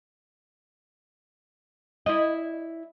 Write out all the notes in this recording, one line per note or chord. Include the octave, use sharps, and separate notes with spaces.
E4 D5 D#5